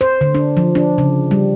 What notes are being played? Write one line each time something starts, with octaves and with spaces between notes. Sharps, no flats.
C5
D3
D4
F3
D4
C#3
G3